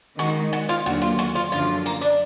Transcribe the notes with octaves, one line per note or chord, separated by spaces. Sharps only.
D#3 G#3 D#4 F#4
F#4
F4
D#2 D3 F#3 F#4
F4
F#4
F4
F#2 D3 F3 F4
A#3
D4